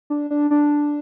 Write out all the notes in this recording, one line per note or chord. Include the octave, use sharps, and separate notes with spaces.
D4
D4
D4